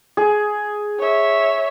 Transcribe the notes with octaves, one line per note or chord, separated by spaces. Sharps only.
G#4
C#5 E5